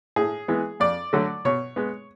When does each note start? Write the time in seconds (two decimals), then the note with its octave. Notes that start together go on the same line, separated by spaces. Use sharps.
0.16 A2 G#4
0.48 E3 G#3 B3
0.80 F2 D5
1.13 D3 F#3 A3
1.45 B2 C#5
1.76 G#3 B3